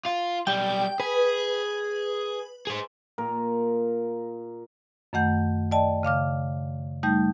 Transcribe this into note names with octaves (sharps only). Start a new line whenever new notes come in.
F4
B1 G3 G5
G#4 B4
G#4 C5
A#2 A#4
F#2 D#3 A3 F#5 G6
D5 D#5 G5 A5
C#3 F5 D6 F6
G3 A3 D#4 G6